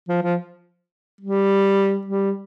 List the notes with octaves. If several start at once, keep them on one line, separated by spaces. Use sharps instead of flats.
F3
F3
G3
G3